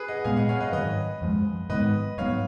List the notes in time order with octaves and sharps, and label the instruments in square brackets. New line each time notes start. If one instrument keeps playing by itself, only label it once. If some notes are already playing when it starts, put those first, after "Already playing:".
Already playing: [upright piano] G#4 B4
D#5 F#5
[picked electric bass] A#2 G#3 B3 [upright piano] F5 G#5
[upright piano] D#5 F#5
C#5 F5
B4 D#5
[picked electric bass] G#2 D#3 F#3 [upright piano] B4 D#5
[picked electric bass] F#2 F3 G#3
[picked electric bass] G#2 D#3 G#3 B3 [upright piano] B4 D#5
[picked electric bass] G#2 F#3 B3 [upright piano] C#5 F5